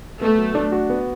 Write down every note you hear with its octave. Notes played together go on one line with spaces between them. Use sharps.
A3 B3
F#3
D4
F#4
B3